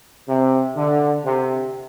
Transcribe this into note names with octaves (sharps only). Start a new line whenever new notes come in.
C3
D3
C3